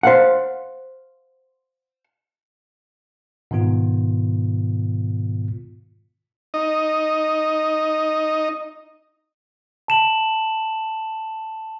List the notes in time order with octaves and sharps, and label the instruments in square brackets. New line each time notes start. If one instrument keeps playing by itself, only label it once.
[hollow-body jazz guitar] C5 F5 F#5
[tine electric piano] G#2 B2 D#3 B3 F4
[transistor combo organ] D#4 D#5
[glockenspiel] A5 E7 F#7